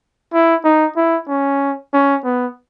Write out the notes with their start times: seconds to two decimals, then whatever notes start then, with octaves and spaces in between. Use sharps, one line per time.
0.33 E4
0.64 D#4
0.97 E4
1.28 C#4
1.93 C#4
2.24 B3